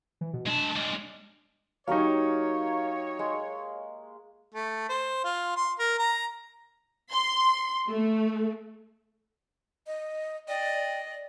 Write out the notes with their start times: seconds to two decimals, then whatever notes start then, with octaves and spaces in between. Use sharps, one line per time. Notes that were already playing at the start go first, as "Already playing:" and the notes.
0.21 E3
0.33 B2
0.47 G#3 D4 A5
0.76 G3 G#3
1.88 F#3 A#3 D#4 G4 C#5 C#6
3.19 G#3
4.54 A3
4.89 C5
5.25 F4
5.56 C6
5.79 A#4
5.99 A#5
7.12 C6
7.89 A3
9.87 D#5
10.48 D5 D#5 G5